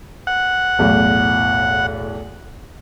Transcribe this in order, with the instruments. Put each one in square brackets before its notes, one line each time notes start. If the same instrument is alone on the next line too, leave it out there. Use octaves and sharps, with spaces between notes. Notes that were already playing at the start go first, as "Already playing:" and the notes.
[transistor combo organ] F#5
[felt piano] B1 E2 A2